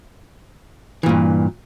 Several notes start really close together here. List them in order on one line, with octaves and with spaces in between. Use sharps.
E3 A#2 G2